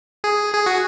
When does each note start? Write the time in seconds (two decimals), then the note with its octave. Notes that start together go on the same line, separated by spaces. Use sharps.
0.24 G#4
0.54 G#4
0.66 F#4